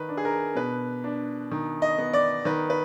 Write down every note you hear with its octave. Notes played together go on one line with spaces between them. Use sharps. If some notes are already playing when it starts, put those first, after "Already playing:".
Already playing: D#3 B4
D4
G#4
A#4
B2 B4
D4
D#3
D#5
B3
D5
D#3 B4
B4